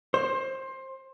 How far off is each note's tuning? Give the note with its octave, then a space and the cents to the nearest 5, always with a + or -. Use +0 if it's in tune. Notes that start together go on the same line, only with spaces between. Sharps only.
C5 +20